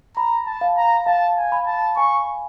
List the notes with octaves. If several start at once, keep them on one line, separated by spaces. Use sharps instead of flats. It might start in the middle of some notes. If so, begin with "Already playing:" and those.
A#5 B5
A5
F5
A#5
F5 A5
G#5
B5
A5
G#5 C#6